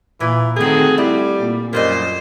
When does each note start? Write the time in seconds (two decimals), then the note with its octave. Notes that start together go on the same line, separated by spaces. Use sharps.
0.20 A#2 E3
0.56 D3 D#3 A3 C4 F#4 G#4
0.98 G3 E4
1.39 A#2
1.73 F#2 A#2 G3 F4 C5 D#5